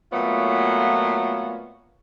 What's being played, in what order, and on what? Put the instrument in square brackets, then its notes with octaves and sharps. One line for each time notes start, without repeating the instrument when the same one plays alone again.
[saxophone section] A#2 F#3 A3 B3 F4 C#5